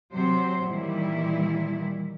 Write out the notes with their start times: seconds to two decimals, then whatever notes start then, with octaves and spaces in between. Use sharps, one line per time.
0.12 C3 F#3 C5
0.66 A#2 D#3 E3 G3 E4